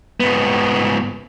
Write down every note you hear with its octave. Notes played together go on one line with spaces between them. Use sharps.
G#2 B3